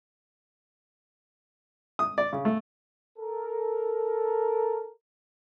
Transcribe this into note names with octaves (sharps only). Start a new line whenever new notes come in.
D#6
D5
C#3
A3
A4 A#4